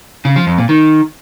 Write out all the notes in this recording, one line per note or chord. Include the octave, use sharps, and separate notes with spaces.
C#3
F3
F2
A#2
D#3